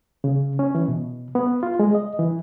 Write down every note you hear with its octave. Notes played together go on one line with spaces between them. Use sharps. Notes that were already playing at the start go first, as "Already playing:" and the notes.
C#3
C#4
E3
B2
B3
F4
G#3
D#5
E3